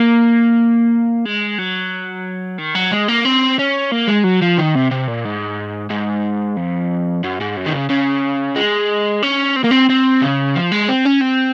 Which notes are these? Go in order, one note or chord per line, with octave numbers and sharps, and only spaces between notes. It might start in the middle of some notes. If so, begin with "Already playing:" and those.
Already playing: A#3
G#3
F#3
D#3
F#3
G#3
A#3
C4
C#4
A#3
G#3
F#3
F3
D#3
C3
C3
A#2
G#2
G#2
F2
F#2
G#2
F#2
D#3
C#3
C#3
G#3
C#4
C4
A#3
C4
C4
C#3
F3
G#3
C4
C#4
C4